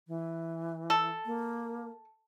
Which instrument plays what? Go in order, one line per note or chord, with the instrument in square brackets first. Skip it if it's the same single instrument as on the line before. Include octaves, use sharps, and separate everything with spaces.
[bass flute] E3
[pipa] A4
[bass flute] A#3